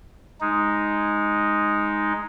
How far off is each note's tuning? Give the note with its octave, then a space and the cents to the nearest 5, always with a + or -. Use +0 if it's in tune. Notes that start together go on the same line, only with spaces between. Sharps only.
G#3 +0 D#4 +0